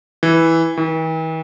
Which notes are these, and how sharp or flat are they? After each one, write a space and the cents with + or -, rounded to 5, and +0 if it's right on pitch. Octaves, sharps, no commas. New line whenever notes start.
E3 -5
E3 -45